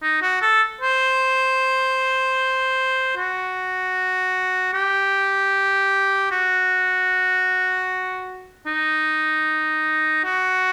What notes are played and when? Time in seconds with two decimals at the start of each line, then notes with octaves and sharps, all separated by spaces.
0.02 D#4
0.22 F#4
0.41 A4
0.81 C5
3.17 F#4
4.74 G4
6.31 F#4
8.66 D#4
10.24 F#4